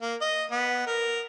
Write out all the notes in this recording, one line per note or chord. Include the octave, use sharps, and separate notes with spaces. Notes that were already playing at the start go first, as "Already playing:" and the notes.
A#3
D#5
B3
A#4